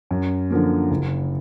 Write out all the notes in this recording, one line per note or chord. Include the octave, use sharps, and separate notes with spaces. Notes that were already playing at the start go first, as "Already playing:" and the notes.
F#2
D3 F3 A#3
F#1